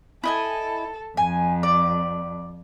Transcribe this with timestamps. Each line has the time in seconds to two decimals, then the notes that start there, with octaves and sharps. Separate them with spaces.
0.24 E4 A4 D#5 G#5
1.17 F2 G#5
1.63 D5